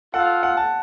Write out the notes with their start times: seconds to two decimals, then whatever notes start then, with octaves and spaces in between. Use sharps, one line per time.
0.14 F4 A4 F5 F#5
0.43 F#5
0.57 A5